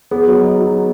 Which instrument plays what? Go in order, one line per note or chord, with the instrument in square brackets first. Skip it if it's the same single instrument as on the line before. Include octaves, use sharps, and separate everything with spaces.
[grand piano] B3 [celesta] G#4
[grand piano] F#3
D#4
F#3
B3